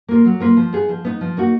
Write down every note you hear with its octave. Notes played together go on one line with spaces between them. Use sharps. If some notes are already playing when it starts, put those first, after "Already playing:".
A#3 F4 A#4
F#3
A#3 F4 B4
F3
B3 D#4 G#4
F3
B3 D#4
F3
A#3 D#4 F#4